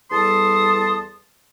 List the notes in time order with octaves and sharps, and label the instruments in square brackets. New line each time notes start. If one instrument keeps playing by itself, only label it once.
[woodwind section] E2 G3 A4 A5 C6 D#6